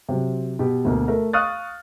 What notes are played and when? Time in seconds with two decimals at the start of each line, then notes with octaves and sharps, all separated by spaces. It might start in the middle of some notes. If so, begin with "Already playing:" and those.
0.09 C3 F#3
0.59 B2 G4
0.84 D2 B2 A#3
1.08 A3 A#4
1.33 F5 C#6 D#6 F6 F#6 A6